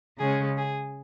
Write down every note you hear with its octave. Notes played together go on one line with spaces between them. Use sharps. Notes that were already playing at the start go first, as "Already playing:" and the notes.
C#3 G#3 C#4 G#4
G#4